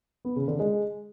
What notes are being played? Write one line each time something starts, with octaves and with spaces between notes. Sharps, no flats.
B3
C#3
D3
G#3